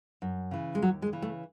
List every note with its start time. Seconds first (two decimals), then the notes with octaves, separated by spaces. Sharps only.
0.22 F#2
0.51 C#3 E3
0.75 G#3
0.82 D#2 F#3
1.02 G#3
1.13 C#3 E3
1.22 A3